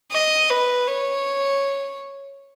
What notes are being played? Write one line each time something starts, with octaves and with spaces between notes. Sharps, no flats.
D#5
B4
C#5